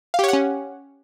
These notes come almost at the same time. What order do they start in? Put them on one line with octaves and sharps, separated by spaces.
F5 G4 C#5 F#5 C#4